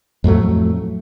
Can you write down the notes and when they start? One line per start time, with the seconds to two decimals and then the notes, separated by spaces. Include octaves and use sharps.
0.24 F2 A2 F#3 A3